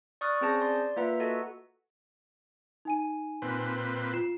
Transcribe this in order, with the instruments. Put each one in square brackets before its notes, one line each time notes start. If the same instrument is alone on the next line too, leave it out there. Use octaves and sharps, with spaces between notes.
[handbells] D5 C#6 D#6 F6 F#6 A6
C4 C#4 G#4 C5 A5 A#6
D5 C6
A#3 F4 B4 E5 F#5 A#5
F#4 A4 D#5 F#5
[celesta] D#4 G#5 D#7
[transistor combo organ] A#2 C4 B4
[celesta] F4 C7 E7